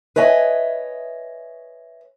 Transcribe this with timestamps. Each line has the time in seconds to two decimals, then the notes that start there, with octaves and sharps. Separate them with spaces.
0.16 B4 C#5 D#5 E5 G#5